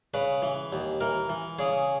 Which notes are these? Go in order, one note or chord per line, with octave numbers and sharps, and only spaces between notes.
C#3 B4
E3
D#2
E3 A#4
E3
C#3 G#4